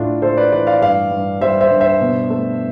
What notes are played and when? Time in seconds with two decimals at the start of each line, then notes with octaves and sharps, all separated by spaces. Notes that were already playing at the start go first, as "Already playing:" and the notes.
Already playing: A2 A3 D4 F4
0.22 A2 A4 C5
0.37 B4 D5
0.52 E3 B4 D5
0.67 D5 F5
0.82 G2 D5 F5
1.11 G2
1.41 G3 C5 E5
1.61 C5 E5
1.71 G2
1.81 C5 E5
2.01 B2
2.30 A3